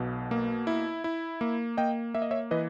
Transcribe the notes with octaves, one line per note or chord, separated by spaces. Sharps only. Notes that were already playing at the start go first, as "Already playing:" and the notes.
Already playing: B1 B2
A#3
E4
E4
A#3
A#3 D#5 G5
A#3 E5
D#5
C#5 E5
E3 B4 D#5